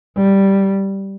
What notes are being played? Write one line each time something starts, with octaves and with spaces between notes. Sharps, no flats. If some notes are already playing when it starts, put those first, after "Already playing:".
G3